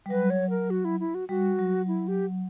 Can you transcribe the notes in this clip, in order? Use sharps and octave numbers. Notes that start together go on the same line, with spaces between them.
G3
F#3 B4
C#5
A#4
F#4
E4
E4
F#4
G3 F#4
F#3
E4
G4